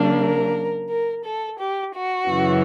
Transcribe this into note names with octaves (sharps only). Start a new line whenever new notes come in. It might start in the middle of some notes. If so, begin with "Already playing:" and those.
Already playing: C#3 F#3 A#3 D4
A#4
A#4
A4
G4
F#4
F#2 C#3 E3